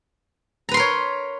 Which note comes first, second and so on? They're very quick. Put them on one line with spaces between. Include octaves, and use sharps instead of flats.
A#5 B4 C6 A#4 C#5